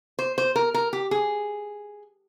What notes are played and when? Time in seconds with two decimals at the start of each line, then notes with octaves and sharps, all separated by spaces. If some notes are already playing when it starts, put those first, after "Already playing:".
0.19 C5
0.38 C5
0.56 A#4
0.74 A#4
0.93 G4
1.11 G#4